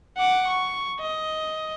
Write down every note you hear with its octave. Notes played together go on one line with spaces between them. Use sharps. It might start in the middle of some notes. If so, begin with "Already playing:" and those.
F#5 D6
C#6
D#5